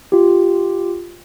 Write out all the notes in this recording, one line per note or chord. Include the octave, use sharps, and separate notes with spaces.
F4 G4